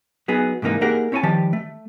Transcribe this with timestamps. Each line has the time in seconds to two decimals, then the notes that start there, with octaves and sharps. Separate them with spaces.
0.28 F#3 B3 D#4 G#4
0.62 G#2 C3 E3 A#3 D#4
0.81 A#3 D#4 G4 G#4 A#4 F#5
1.12 C4 E4 C#5 F5 G#5 A5
1.23 D#3 F3 G3 G4 A5
1.53 A3